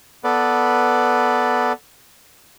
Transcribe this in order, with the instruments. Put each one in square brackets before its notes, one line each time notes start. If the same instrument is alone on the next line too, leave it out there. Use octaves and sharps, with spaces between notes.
[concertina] B3 A4 B4 D5